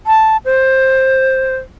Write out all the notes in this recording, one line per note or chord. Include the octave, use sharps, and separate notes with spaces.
A5
C5